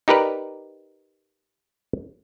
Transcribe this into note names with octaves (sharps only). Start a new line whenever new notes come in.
D#4 G4 A#4 B4 D5